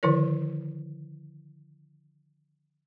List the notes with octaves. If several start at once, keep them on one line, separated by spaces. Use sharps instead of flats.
D3 D#3 F3 E4 A#4 C#5